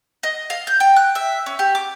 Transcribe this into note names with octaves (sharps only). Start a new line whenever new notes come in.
D#5
F5
G6
G5
F#6
E5
C#4
G4
D6